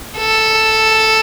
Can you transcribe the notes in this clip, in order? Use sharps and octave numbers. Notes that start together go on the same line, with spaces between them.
A4